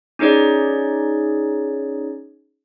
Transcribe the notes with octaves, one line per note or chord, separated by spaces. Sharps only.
C#4 D#4 G#4 C#5 D5